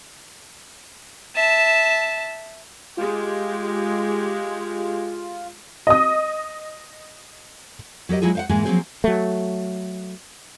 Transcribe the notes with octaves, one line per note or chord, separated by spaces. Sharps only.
E5 A5
G#3 F4 G4
D#5 D#6
F#3 G4 A#4 D#5
F#3 G#3 E4 F4 G#4
C5 F5 F#5
G#2 E3 G#3 A#3 G#4
F3 F#3 A#3 C4 G#4 C5
F#3 A3